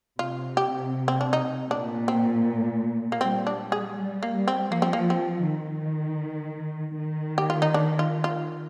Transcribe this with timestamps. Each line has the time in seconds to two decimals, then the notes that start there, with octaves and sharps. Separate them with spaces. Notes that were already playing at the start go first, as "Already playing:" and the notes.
0.19 C3 F4
0.57 G4
1.08 C4
1.21 D4
1.33 D#4
1.70 A#2 D4
2.08 C4
3.12 A#3
3.21 G3 C4
3.47 D4
3.72 G#4
3.96 G3
4.23 A#3
4.34 G3
4.48 C4
4.72 F3 A#3
4.82 C4
4.93 A#3
5.10 C4
5.48 D#3
6.98 D#3
7.38 G4
7.50 F4
7.62 D#4
7.74 D4
7.99 F4
8.24 F4